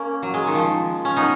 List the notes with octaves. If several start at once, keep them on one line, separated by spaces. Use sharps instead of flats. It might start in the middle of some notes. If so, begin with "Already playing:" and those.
Already playing: A#3 C#4
F#3
G#3
D#3
F3
C#4
B3 D#4